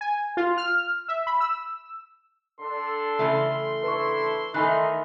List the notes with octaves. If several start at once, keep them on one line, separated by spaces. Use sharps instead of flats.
G#5
F4
F6
E5
B5
E6
D3 D4 A4 C6
C#3 E3 A3
D4 E4 A4 B4 C#6
D#3 E3 A3 D#4 G#5 B5 F#6